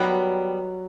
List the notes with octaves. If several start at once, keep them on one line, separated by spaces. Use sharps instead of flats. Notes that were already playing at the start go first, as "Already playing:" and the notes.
Already playing: D#3 F#3 G3 B3